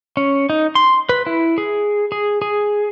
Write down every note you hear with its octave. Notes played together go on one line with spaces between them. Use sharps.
C#4
D#4
C6
B4
E4
G#4
G#4
G#4